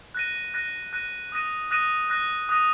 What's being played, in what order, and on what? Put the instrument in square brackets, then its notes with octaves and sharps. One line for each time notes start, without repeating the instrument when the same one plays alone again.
[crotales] F#6 A#6 D#7
F#6 A#6 D#7
F#6 A#6 D#7
D#6 F#6 A#6 D#7
D#6 F#6 A#6 D#7
D#6 F#6 A#6 D#7
D#6 F#6 A#6 D#7